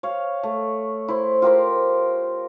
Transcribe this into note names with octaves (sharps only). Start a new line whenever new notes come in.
C#5 F5
A3
E4 C5
F4 G4 A#4 C5